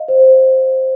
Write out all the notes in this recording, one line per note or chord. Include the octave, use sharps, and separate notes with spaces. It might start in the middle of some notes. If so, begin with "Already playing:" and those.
Already playing: D#5 F5
C5